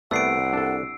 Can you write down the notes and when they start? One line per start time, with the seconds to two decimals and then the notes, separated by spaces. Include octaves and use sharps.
0.11 C2 A3 B3 D5 F#5 E6 C7 D7
0.53 D4 A4